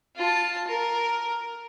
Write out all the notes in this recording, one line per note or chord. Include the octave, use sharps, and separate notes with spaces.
F4 A5
A#4